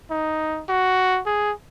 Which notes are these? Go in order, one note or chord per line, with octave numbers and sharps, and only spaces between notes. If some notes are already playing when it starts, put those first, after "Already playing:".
D#4
F#4
G#4